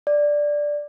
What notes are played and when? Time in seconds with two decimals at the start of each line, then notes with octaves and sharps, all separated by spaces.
0.07 D5